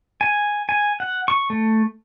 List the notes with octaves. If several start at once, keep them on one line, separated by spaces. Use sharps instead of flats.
G#5
G#5
F#5
C#6
A3